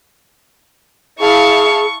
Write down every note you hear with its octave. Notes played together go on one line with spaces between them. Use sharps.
E4 G#4 F5 A5 C#6